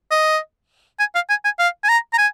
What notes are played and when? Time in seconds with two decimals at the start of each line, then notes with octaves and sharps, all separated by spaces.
0.11 D#5
0.99 G#5
1.15 F5
1.30 G#5
1.45 G#5
1.59 F5
1.84 G#5
1.89 A#5
2.13 A#5
2.18 G#5